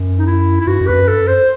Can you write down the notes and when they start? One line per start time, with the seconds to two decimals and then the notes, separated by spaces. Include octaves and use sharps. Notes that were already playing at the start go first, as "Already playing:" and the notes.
Already playing: F#2
0.19 D#4
0.26 E4
0.61 E4
0.67 G2 F#4
0.81 F#2
0.87 E2 B4
0.94 F#2
1.08 G2 A4
1.21 F#2
1.28 C5